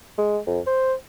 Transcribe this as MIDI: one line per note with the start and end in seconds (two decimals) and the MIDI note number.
0.18 0.39 56
0.47 0.60 41
0.67 0.94 72